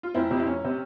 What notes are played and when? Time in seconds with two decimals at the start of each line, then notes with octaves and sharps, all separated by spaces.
0.03 F4
0.14 F1 C4 E4
0.31 F2 C3
0.40 E4
0.47 F1 C#4
0.65 C3